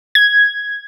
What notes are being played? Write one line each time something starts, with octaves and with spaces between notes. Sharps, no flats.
G#6